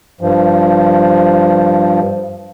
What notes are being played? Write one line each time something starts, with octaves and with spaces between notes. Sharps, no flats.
G2 F3